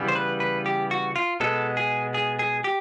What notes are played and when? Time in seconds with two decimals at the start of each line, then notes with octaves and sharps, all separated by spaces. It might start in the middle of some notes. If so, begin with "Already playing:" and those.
Already playing: C#3 E3 G3 B3
0.08 C5
0.15 B4
0.40 B4
0.66 G4
0.91 F#4
1.16 F4
1.40 B2 G#3 B3 A4
1.77 G#4
2.14 G#4
2.39 G#4
2.64 G4